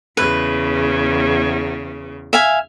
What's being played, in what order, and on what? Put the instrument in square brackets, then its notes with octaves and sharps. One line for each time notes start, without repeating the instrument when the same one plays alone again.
[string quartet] E2 C#3 [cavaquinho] B4
[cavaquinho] E5 F5 G#5